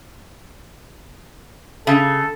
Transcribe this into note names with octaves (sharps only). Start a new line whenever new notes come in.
C#3 A4